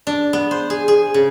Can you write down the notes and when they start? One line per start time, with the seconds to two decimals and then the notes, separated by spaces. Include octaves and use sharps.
0.07 D4
0.33 B3
0.51 C5
0.70 G#4
0.88 G#4
1.14 C#3